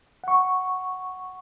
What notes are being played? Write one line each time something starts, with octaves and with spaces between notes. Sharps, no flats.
F#5 C#6